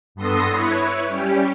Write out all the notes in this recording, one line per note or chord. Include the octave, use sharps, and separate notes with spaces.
G2 B3 A4 C6 D#6 A#6
E4 B4 C#5
G3 C#4 G4